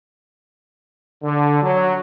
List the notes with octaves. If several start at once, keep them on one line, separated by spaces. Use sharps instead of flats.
D3
F#3